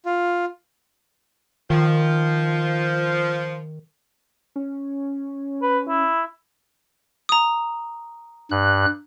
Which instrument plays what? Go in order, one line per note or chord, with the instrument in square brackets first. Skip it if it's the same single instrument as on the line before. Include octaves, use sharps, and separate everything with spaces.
[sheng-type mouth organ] F4
[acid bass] D#3 [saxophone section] F3
[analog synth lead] C#4
[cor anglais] B4
E4
[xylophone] A#5 D#6
[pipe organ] G2 F#6